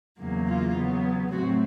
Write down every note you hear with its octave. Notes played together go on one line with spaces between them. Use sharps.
E2 C#3 F#3 A#3
F4
C#3 F#3 B3
A2 F#3 A3 C4 F#4